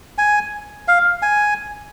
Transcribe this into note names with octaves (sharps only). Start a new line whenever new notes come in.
G#5
F5
G#5